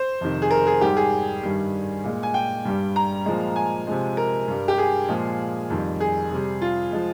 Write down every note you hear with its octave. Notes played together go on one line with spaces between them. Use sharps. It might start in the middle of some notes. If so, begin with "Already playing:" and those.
Already playing: C5
F2 C3 D#3
G#4
A#4
G#4
G#2 G3 G4
G#4
G2 D#3 G3
A#2 G#3
G#5
G5
G2 G3
A#5
A#2 F3 G#3
G#5
C3 F3 G#3
A#4
G2 G3
G4
G#4
A#2 F3 G#3
F2 D#3 G3
G#4
C3 G3
F4
F3 G#3